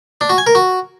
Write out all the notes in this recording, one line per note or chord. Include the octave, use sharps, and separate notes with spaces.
D4
F#4
G#5
A#4
F#4